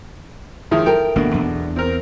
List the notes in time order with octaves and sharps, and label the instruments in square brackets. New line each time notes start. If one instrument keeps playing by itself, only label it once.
[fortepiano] D#3 F3 G#3 [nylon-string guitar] E4
[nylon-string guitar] A4 A#4 [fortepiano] G5
[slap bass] G#1 A#3 D4 [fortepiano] B2
[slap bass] E2 [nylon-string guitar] D4
[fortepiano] C4 A#4